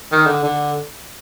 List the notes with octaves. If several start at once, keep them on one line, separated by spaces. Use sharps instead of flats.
D#3
D3
D3